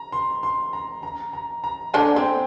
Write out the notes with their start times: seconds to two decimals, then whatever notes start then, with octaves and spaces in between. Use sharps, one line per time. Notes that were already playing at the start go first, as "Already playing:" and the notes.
Already playing: A#5
0.12 C6
0.43 C6
0.73 A#5
1.03 A#5
1.33 A#5
1.64 A#5
1.94 D3 D4 G#5
2.16 C4 G5